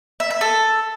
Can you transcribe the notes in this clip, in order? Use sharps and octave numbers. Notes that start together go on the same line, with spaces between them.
E5
E5
A4